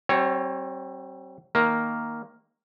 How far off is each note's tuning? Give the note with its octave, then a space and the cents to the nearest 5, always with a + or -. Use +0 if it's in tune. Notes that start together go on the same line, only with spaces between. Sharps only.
G3 -45 C4 +30 C#5 +0
D#3 +0 A#3 +0